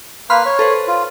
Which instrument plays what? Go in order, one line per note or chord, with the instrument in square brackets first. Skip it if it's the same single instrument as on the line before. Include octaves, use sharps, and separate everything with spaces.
[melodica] A#3 B4 [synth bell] B5 C6 F6
[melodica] C#5
[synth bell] A4 B4 C5
[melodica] F4